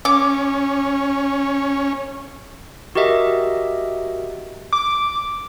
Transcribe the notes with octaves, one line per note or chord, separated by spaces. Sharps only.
C#4 D6
F#4 G4 A#4 D#5 E5
D6